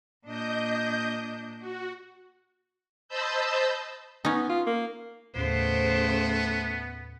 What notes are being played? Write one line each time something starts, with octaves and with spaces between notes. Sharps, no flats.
A#2 D4 D#5 G6
F#4
C5 D#5 A5 B5 E6 G6
B3 C#4 D#4
F4
A#3
D#2 A2 C#3 A3 B3 C5